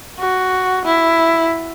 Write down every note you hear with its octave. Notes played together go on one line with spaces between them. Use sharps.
F#4
E4